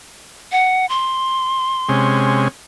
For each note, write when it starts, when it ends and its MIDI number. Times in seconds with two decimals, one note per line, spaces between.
0.52 0.86 78
0.89 2.41 84
1.89 2.48 48
1.89 2.48 56
1.89 2.48 61